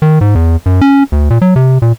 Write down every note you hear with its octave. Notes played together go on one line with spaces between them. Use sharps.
D#3
G#2
E2
F#2
C#4
D2
A#2
F#3
C3
A#2